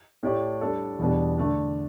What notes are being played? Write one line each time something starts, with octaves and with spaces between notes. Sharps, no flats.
A2 A3 G4 D5
G3 D4 A4 D5
E2 B2 G3 D4 B4
D3 A3 D4